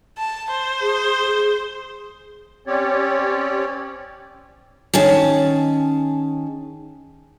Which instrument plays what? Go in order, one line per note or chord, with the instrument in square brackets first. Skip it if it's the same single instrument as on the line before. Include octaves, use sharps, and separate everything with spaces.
[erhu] A5
C5
[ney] G#4
G#4
[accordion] C4 C#4 G4 C#5 D5
[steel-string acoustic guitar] D#3 C#4 G#4 A5